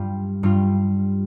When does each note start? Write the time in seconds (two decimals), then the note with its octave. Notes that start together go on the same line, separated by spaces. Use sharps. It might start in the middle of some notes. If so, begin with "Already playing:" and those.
Already playing: G2 G3 F4
0.43 G2 G3 F4